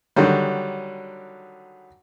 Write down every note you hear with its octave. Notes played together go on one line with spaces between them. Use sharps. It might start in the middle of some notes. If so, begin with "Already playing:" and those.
D3 D#3 F#3 G3